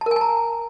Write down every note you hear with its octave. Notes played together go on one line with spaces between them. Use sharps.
A5
A#4
G#5
A5
A#5